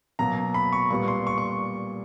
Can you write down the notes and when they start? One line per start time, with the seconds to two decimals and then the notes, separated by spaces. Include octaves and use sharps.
0.19 B2 F#3 A#3 A#5
0.54 B5
0.73 C#6
0.90 A#2 G3 B3 C#6
1.08 C6
1.27 C#6
1.38 C#6